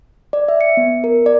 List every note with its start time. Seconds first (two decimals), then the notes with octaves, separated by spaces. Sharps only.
0.33 D5
0.48 E5
0.61 C#7
0.77 B3
1.04 A#4
1.26 D5